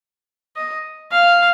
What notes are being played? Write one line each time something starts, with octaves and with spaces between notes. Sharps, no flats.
D#5
F5